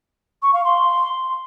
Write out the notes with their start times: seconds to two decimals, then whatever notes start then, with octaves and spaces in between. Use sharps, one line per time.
0.43 C#6
0.54 F5
0.65 C6